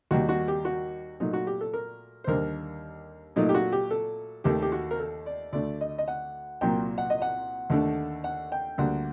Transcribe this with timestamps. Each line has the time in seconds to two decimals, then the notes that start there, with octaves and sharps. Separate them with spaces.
0.11 D#2 D#3 G3 A#3 F#4
0.29 F#4
0.48 G4
0.65 F#4
1.20 A#2 F#3 A3 D#4
1.33 F#4
1.47 G4
1.61 A4
1.74 A#4
2.24 C5
2.27 D#2 D3 G3 A#3 A#4
3.36 A#2 F#3 A3 D#4
3.49 G4
3.54 F#4
3.72 G4
3.91 A4
4.44 D#2 D#3 A3 G4
4.62 G4
4.72 F#4
4.91 A#4
5.00 A4
5.26 D5
5.53 D2 D3 A3 D5
5.81 D#5
5.98 D#5
6.08 F#5
6.61 C2 A#2 F#3 A#3 G5
6.98 F#5
7.10 D#5
7.22 F#5
7.70 D#2 D3 A3
8.24 F#5
8.52 G5
8.78 D2 D3 G3 A#3 F#5